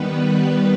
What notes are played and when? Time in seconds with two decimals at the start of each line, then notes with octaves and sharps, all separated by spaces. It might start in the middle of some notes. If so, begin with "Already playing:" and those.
Already playing: D#3 G3 B3 B4
0.45 B4